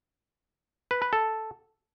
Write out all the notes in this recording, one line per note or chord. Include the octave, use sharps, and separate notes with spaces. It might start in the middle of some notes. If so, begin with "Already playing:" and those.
B4
B4
A4